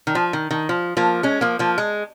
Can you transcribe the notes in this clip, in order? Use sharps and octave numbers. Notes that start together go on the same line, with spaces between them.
D#3
F3
D#3
D#3
F3
F3 A#3
G#3 C#4
F3 A#3
F3 A#3
G#3